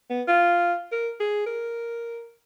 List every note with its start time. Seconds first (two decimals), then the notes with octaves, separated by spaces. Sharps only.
0.10 B3
0.28 F4
0.92 A#4
1.20 G#4
1.46 A#4